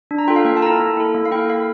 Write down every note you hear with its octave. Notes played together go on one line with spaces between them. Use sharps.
D4
A#5
F4 A4 G5
F5
A#3 G5
A5
E4 A4 A#5
A#3
E4 A4
A#3
F5
E4 A4 G5
A#3 F5